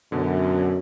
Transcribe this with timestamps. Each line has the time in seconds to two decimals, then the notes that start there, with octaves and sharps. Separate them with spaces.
0.12 F#2 B2 D3